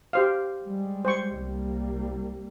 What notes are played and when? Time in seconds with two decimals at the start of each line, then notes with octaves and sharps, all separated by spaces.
0.13 G4 C5 F5
0.63 G3 G#3
1.05 C5 G5 C#6
1.38 C2 G3 A#3